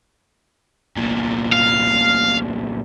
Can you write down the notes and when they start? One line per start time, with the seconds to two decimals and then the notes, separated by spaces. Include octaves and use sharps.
0.96 C2 A#2
1.53 F5